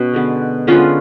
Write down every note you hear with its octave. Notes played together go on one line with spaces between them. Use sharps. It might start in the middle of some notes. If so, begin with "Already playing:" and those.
Already playing: B2 C#4
D3 G#3 B3
D3 G#3 B3 C#4 F4